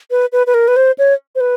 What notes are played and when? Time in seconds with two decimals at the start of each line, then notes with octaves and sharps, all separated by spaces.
0.11 B4
0.32 B4
0.47 B4
0.54 A#4
0.68 B4
0.76 C5
0.98 C#5
1.35 C5
1.40 B4